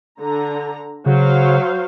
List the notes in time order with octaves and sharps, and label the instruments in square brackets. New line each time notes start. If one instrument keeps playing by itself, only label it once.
[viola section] D3 A#5
[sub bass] C#3 [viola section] F#3 C5 F5